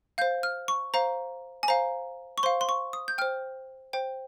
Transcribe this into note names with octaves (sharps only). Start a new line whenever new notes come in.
C5 F5 G6
F6
C#6
C5 F5 A#5
G#5
C5 F5 A#5
C#6
C5 F5 C6
C6
C#6
D#6
G6
C5 G5 F6
C5 G5